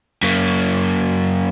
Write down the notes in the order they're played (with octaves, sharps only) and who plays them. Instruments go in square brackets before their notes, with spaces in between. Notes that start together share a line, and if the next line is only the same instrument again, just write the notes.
[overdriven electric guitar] F#2 A#3